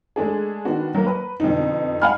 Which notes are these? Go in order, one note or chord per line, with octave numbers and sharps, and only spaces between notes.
G#3 A3 D4 G#4
D#3 B3 D4 F#4
F#3 A#3
B4
F2 B2 D3 D#4
F5 F#5 G#5 B5 F6